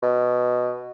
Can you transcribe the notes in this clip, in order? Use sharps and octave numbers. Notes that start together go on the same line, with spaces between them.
B2